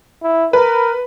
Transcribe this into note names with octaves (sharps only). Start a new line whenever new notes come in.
E4
A#4 B4